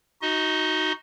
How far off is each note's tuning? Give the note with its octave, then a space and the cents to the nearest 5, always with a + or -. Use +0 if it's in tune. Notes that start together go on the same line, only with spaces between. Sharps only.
D#4 +0 F#4 +0 D#5 +30